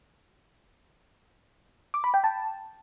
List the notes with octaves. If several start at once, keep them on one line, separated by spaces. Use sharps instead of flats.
D6
B5
G5
A5